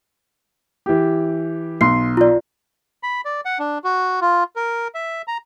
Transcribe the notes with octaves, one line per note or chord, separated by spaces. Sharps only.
E3 G4
B1 C6 C7
F4 D5
B5
D5
F#5
D4
F#4
F4
A#4
E5
A#5